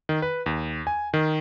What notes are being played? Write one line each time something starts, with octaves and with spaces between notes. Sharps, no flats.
D#3
B4
D#2
G#5
D#3